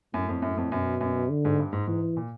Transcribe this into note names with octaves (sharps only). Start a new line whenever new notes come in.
F#2 A2
F2
F#2
F2
F#2 B2
F#2
D3
G#2
G2
G#2
G#2 E3
A#2